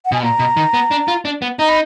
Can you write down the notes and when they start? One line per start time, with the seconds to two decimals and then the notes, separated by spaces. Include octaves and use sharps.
0.05 F#5
0.12 B2 G#5
0.23 A#2 A#5
0.39 B2
0.57 D#3
0.74 B3
0.91 D4
1.08 F4
1.25 D4
1.42 B3
1.59 D#4 A#5
1.69 B5